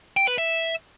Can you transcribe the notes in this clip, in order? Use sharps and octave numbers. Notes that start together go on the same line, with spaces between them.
G5
B4
E5